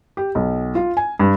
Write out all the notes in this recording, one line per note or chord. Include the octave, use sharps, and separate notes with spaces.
G4
B1
F4
G#5
G2